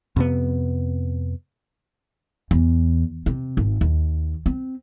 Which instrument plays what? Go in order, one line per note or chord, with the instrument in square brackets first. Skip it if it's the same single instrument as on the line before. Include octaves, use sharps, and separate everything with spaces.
[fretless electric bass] F2 C3 B3
[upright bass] E2
C3
G#1
D#2
C4